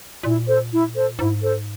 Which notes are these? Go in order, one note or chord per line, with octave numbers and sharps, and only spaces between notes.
A#2 E4
A4 C5
E4
A4 C5
G#2 E4
A4 C5